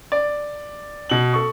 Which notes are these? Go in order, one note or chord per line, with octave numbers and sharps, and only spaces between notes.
D5
B2 F#7
A4 C#6